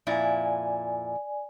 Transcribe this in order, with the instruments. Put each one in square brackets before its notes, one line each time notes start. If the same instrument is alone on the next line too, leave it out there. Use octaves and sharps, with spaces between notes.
[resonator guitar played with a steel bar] F2 A#2 E4 [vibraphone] D5 G#5